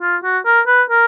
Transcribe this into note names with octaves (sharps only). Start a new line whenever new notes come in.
F4
F#4
A#4
B4
A#4